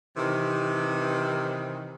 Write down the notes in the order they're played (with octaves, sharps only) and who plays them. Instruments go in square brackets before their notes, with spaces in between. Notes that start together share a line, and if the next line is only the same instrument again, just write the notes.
[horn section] C3 D#3 E3